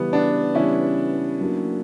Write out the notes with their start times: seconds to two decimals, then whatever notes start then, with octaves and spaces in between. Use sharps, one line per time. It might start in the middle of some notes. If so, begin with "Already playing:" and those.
Already playing: C#3 E3 G3 B3 C#4
0.13 B3 D4
0.55 C#3 E3 G3 C#4 E4
1.40 F#3 A#3 D4